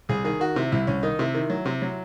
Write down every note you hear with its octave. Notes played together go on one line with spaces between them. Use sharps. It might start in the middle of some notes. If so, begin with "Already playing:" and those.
C2 G#4
D#3 G#4
D#3 F#4
C3 E4
C2 E4
C2 C#4
D#3 D#4
C3 E4
D#3
F#3
C3
F#3